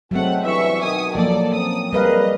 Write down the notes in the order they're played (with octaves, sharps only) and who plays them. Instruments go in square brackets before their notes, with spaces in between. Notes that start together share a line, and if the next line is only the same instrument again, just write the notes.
[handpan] F#3 G#3 C4 [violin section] A3 F#5
[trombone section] G2 B2 E3 [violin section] E5 C#6
[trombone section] B2 D#3 [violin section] G#5 D#6
[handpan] F3 F#3 A#3 [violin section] A4 D5
[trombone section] C4 C#4 [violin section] D#6
[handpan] G3 B4 F5 [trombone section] C4 G#4 A#4 [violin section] D#5